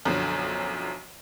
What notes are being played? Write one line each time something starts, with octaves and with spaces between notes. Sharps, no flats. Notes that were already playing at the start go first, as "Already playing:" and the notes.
B1 F#2 D3 F3